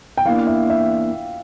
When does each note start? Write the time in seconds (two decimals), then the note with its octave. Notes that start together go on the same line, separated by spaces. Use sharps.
0.17 G5
0.25 E2 E3 A#3 D4 F5
0.47 E5
0.70 E5